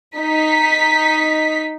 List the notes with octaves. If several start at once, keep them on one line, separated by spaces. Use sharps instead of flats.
D#4 B6